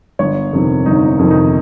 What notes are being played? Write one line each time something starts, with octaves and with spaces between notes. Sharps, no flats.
G1 C#5
F2 C3 D#3
G1 D#4
D#4
F2 C3 D#3
D#4